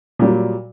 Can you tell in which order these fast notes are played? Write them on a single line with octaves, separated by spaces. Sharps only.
A#2 G3 F#3